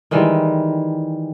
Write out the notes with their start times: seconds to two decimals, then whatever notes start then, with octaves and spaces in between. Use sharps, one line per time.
0.11 D#3 E3 G3 G#3